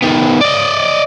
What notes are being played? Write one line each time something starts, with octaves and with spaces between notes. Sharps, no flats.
D#3 B3
D5 D#5